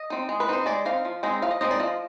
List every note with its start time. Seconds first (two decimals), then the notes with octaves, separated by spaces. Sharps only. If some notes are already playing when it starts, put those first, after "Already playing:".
Already playing: D#5
0.10 C4 D#4
0.29 G#3
0.40 B4
0.48 C4 D#4 C5
0.66 G#3 D5
0.85 C4 D#4 F5
1.05 F3
1.23 G#3 C4 D#4
1.42 F3 F5
1.51 D#5
1.61 G#3 C4 D#4 D#5
1.71 D5
1.80 F3 D#5